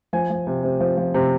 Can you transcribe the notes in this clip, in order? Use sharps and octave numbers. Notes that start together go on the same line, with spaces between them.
F3 G#5
F3
C3
C3
F3
F3
C3